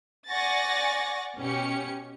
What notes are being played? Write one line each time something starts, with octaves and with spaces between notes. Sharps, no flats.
D5 F#5 G#5 C#6 A6 A#6
B2 C#4 G4 C#7